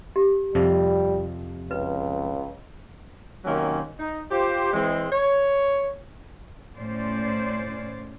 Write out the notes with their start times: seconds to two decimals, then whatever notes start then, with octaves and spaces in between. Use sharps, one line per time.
0.16 G4
0.55 F2 C3 F3 G3
1.71 C#2 B4
3.45 C3 D#3 F#3 A#3 C4 C#4
3.99 D#4
4.31 F4 G4 C5
4.73 E3 G#3 C4
5.11 C#5
6.77 A2 C#4 C5 D5